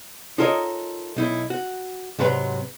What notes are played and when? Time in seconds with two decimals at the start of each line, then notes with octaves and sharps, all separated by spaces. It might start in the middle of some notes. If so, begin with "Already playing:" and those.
0.38 D#4 F4 A4 A#4 C#5 D#5
1.16 B1 D#4 E4
1.50 F#4
2.19 G#2 C3 F#3 B4 F#5 A#5